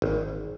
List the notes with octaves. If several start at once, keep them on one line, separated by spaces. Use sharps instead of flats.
G#1